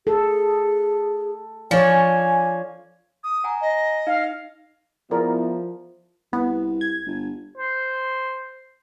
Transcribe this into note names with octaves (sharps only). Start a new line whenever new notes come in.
G#4 A4
F3 C#5 D5 G#5
D#6
F#5 G#5 A#5
D#5
D#4 F5
F3 B3 E4 G#4 A#4 D5
C2 B3
G#6
G1
C5